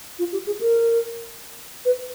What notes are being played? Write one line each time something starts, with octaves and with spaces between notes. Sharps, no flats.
F4
G4
G#4
A#4
B4